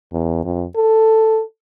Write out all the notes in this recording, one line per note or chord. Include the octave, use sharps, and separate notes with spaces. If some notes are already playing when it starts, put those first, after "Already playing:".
E2
F2
A4